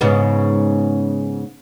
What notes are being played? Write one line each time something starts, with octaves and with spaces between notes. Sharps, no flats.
G#2 C#3 B3